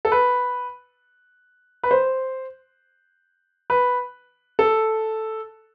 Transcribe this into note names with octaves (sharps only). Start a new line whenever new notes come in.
A4
B4
B4
C5
B4
A4